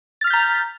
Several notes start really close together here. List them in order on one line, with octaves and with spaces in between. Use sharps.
A6 F6 B6 G6 A#5